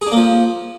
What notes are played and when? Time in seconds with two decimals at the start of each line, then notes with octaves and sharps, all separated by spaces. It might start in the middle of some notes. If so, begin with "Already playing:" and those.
0.01 G#4
0.07 D4
0.12 A#3
0.17 F3